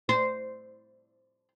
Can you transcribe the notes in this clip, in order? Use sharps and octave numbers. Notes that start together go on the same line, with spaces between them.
C5